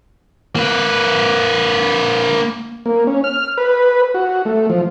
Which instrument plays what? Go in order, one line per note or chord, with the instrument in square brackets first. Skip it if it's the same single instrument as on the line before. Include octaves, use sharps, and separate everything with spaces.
[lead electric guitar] A#3 B4
[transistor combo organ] A#3
C#4
F6
B4
F#4
A3
F3